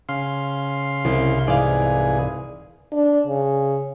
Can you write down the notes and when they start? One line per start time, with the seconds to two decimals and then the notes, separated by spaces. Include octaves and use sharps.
0.09 C#3 F5 C6
1.05 C2
1.47 G#2 E3 G#4 D5 F5
2.92 D4
3.27 C#3